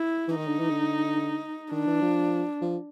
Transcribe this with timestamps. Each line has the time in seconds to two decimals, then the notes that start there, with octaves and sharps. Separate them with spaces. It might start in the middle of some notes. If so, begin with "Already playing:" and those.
Already playing: E4
0.28 E3
0.37 D#3 D#4
0.48 D3
0.59 E3
0.70 D3
1.72 D#3 D4
1.87 E3
2.02 F3
2.62 F3